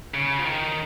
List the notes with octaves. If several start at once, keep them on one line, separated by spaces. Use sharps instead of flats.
C#3
F3
D#3